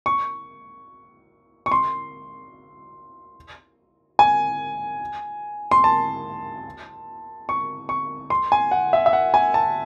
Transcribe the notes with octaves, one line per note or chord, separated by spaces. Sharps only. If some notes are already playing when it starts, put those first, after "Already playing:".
C#6
C#6
C6
G#5
C6
A5
C#6
C#6
C6
G#5
F#5
E5
E5
F#5
G#5
A5